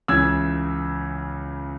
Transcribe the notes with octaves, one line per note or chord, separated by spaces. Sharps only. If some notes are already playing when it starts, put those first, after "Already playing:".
C#2 C#3 E3 E6 G#6